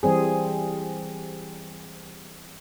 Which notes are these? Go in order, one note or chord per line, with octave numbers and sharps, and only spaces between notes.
E3 G3 C4 G#4